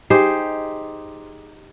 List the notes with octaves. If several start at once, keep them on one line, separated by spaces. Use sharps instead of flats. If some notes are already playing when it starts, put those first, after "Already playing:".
D#4 G4 G#4 C5